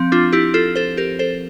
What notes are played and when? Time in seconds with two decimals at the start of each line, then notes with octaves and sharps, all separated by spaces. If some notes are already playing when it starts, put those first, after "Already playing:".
Already playing: F3 C4
0.12 D4 F4
0.32 E4 G4
0.54 F4 A4
0.75 A4 C5
0.97 G4 A#4
1.19 A4 C5